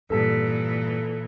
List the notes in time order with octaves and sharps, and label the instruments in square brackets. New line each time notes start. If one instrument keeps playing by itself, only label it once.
[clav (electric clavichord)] G2 [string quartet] A#2 E3 [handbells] A4 A5 B6